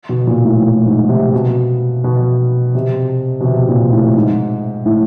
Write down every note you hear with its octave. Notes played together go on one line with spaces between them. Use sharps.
B2
A#2
A2
A2
G#2
C3
B2
B2
C3
B2
C3
A#2
A2
G#2
A2